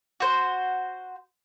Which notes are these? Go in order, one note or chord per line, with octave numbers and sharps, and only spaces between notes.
F#4 C5